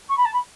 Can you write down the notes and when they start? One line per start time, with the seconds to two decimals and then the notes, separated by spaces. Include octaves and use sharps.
0.08 C#6
0.17 B5
0.25 A5
0.33 B5